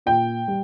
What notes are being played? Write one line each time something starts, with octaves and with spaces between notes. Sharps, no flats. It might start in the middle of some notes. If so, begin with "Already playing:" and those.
A#2 G5
G3